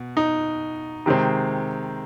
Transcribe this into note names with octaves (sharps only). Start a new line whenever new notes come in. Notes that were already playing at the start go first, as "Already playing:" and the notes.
Already playing: B2
D#4
C3 D#3 G#3 C4